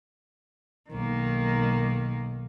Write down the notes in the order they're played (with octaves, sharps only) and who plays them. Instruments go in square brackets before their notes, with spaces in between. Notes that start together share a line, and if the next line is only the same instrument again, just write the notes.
[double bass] B1 [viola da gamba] D#3 A#3